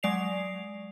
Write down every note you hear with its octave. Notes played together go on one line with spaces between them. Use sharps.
F#3 G#3 D5 C7 F7